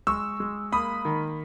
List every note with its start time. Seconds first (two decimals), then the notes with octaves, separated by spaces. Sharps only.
0.07 G#3 C#6 E6
0.40 G#3
0.72 A#3 B5 D#6
1.05 D#3